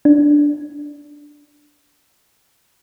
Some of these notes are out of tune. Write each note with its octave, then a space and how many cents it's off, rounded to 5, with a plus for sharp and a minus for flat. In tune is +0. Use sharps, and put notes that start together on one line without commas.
D4 +0